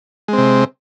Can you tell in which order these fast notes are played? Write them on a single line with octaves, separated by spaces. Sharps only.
G#3 C4 C3